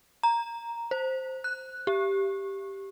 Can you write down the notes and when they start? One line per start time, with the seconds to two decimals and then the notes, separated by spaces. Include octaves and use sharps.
0.23 A#5
0.91 C5
1.44 F#6
1.87 G4